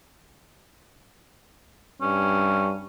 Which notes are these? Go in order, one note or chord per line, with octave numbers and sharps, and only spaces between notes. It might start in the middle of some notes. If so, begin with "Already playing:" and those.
G2 C#4